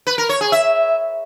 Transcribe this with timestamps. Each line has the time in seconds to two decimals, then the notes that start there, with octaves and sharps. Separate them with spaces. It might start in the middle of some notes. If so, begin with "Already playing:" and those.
0.07 B4
0.18 A#4
0.29 C#5
0.41 G#4
0.52 E5